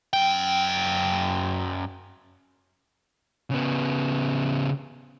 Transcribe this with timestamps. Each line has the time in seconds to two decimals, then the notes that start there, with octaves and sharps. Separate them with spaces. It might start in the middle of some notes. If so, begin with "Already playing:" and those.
0.13 F#2 G5
3.51 C#3 B3